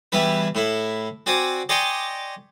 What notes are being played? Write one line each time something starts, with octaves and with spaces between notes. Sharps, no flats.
E2 G3 E4 B4
A2 E4
C4 F#4 D5 G#5
G4 D5 D#5 G#5 C6 C#6